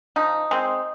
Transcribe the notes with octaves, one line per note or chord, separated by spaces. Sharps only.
F3 D#4
G#3 C4